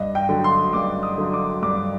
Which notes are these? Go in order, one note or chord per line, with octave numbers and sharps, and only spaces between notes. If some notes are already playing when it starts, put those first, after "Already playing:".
Already playing: G2 D#5
G5
D3 F#3
C6
G2 D6
D#6
D3 F#3
D6
G2 D6